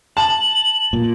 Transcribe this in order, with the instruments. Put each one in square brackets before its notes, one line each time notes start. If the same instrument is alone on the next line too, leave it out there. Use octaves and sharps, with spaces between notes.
[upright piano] A5 [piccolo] F#7
[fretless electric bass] A#2